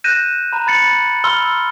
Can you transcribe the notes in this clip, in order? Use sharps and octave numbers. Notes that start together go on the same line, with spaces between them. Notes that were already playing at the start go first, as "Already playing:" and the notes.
F#6 G6 A#6 D#7 E7
A#5 B5
B5 A6 C#7 F#7
B5 C6 E6 F6 G7